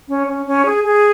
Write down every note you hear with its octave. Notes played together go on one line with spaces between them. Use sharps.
C#4
C#4
C#4
G#4
G#4